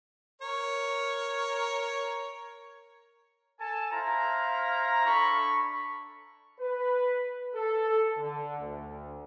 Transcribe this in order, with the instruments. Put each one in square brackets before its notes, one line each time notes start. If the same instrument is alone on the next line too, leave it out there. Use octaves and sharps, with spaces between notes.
[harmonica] A#4 C#5
[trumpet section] A4 G#5 A5
E4 C5 F5 A#5
D4 A4 A5 B5 C#6
[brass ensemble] B4
A4
D3
D2